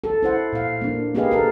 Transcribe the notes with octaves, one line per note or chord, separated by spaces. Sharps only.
A4
E4 C5 F#5
A#2 F5
A#3 D4
A#3 G4 G#4 B4 D#5 F5
A4 A#4